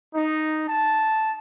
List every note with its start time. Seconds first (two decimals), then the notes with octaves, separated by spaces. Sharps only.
0.14 D#4
0.68 A5